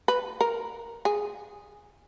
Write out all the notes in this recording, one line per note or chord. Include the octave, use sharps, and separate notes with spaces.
B4
A#4
G#4